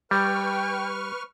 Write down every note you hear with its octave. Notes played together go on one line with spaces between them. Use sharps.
G3 B4 G5 C#6 F6